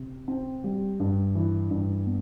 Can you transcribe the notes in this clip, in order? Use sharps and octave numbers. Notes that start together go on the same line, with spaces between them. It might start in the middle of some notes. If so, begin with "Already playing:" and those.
Already playing: C3
C4
G3
G2
E3
G2
B3